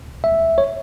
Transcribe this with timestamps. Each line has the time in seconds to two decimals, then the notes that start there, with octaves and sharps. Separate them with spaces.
0.24 E5
0.58 C#5